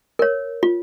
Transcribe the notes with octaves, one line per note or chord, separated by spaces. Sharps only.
A#4 C#5
F4